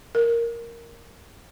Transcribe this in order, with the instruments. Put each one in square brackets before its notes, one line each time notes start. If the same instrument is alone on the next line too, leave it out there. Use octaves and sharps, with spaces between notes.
[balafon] A#4